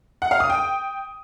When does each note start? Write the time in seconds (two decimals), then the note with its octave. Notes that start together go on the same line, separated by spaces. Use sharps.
0.22 F#5
0.31 F5
0.40 D#6
0.50 G5